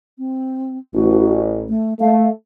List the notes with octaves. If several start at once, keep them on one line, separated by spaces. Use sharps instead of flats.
C4
A1 F#4
A3
A3 F5